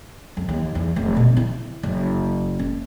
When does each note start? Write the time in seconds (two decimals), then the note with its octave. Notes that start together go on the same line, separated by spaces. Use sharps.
0.37 F2
0.49 D#2
0.75 E2
0.96 F1
1.16 B2
1.37 E4
1.83 F#1
2.59 C#4